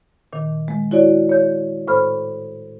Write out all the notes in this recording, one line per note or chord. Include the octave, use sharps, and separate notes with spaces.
A#2 D#3
G#3
E4 F#4 C#5 D5
C#5 G6
A2 C5 B5 F6